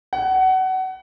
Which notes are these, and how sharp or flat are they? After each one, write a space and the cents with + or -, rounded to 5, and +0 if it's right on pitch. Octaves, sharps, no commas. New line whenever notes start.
F#5 +25